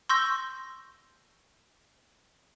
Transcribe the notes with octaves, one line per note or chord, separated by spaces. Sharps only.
C6 C#6 E6 G6 A#6